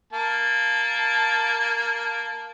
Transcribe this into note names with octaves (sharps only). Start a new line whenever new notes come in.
A#3 A5